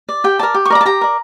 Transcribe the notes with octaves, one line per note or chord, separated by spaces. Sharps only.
D5
G4 G5
A#4 D5 A5
G4
C#6
A#4 D5 A#5
A5
G4 A#5
A#4 D5